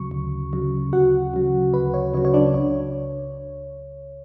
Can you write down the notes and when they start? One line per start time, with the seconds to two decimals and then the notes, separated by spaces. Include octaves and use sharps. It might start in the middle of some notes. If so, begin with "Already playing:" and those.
Already playing: D2 C#3 F#3 C#6
0.11 D2
0.53 C#3 F#3
0.93 D2 F#4 F#5
1.34 C#3 F#3
1.74 D2 B4
1.94 C#5
2.14 C#3 C#5
2.17 F#3
2.25 C#5
2.34 D4 D5
2.54 C#2 C#5